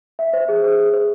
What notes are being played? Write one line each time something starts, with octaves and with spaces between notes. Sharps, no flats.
E5
C5
G#4
G#4
G#4
C5